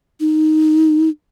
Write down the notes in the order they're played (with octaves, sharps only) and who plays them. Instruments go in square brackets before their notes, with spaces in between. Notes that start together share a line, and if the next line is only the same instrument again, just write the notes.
[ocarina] D#4